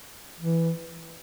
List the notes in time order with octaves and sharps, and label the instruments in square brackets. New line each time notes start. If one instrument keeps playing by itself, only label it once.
[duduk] E3